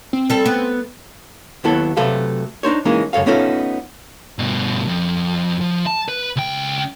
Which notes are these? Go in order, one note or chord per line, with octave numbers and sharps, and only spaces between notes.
C4
G3 A4
B3
D#2 F#3 B3 E4 A4
C3 F#3 A3 A4 B4 F5
D4 D#4 C5 C#5
E3 G#3 A#3 C#4 D#4
C#2 F#2 A4 C#5 F5
A3 B3 C#4 D#4 F4 A4
G2 B2
F2
F3
A5
B4
C#2 G5